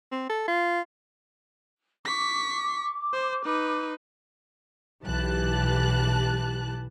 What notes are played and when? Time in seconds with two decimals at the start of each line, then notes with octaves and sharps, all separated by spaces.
0.12 C4
0.30 A4
0.48 F4
2.05 C#6 D6 B6
3.13 C5
3.45 D#4 B4
5.04 B1 E3 G4 A5 F#6